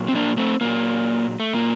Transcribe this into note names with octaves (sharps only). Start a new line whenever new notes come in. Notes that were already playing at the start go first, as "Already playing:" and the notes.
Already playing: A#2 F#3
C4
A#3 D4
A3 C4
A#2 F#3 A#3
A3
A#2 F#3 A#3